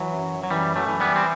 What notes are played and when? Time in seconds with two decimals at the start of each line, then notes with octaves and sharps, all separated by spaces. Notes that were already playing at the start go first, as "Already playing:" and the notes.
Already playing: E3 F#3
0.13 F#2
0.44 F#3
0.51 F#2 E3 G3
0.76 F#3 A3
0.88 E3
1.00 G3 B3
1.16 C4